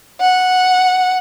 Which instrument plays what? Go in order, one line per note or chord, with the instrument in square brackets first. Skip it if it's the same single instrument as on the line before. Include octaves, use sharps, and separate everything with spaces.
[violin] F#5